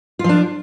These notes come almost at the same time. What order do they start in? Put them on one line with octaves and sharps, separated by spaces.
F4 F3 D4